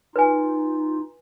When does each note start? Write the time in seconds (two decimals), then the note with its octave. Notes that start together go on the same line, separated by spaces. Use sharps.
0.16 D#4 F4 B4 G#5